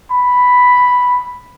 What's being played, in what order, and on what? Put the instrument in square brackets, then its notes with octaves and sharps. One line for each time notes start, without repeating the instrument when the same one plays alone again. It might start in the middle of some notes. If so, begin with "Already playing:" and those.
[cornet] B5